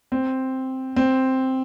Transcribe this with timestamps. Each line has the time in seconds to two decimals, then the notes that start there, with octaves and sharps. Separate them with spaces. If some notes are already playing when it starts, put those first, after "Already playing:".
0.12 C4
0.96 C4